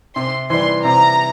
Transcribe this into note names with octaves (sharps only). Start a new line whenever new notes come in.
C3 C6
E3 G3 C6
C3 A#5